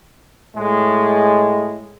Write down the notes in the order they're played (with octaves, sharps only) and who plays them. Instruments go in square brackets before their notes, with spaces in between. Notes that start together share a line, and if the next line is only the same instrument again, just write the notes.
[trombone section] A2 G#3